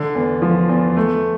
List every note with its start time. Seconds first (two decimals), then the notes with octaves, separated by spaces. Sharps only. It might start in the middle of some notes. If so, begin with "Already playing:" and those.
Already playing: D3
0.15 E2
0.42 F3
0.69 E2
0.96 A3